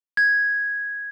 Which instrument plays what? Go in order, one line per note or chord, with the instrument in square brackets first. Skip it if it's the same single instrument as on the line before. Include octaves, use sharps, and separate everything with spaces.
[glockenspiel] G#6